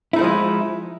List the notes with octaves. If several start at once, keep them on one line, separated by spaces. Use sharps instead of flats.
F3 G#3 A3 D#4 E4